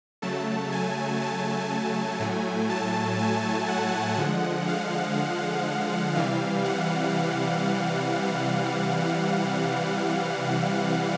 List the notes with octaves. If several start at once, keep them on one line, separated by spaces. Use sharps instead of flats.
C#3 F#3 A3 A5
G#5
A5
G#5
A2 F#3 A3
A5
G#5
F#5
D3 F3 G#3
F5
C3 E3 G3 F5
F#5